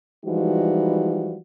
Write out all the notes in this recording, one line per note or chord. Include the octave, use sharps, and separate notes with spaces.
E3 F3 G3 G#3 D#4 F#4